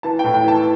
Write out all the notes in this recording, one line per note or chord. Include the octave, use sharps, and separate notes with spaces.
E3 A5
G5
A2
G5
E3 A5